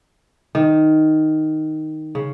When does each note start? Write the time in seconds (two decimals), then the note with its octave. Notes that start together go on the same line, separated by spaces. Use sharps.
0.55 D#3
2.15 C#3